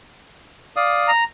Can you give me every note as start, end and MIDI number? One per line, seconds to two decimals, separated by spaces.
0.76 1.11 74
0.76 1.11 77
0.76 1.11 87
1.08 1.24 82